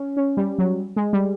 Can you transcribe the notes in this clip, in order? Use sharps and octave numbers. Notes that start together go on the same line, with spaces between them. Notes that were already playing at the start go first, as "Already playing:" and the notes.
Already playing: C#4
C#4
G3
F#3
G#3
G3